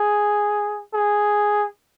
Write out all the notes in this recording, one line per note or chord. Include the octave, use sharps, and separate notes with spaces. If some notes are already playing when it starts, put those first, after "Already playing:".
Already playing: G#4
G#4